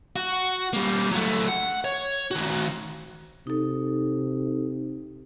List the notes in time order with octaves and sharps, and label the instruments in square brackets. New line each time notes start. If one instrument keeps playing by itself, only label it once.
[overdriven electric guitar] F#4
G3 A#3
F#3 A3
F#5
C#5
D#3 F#4
[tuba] C3 [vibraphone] D#4 A4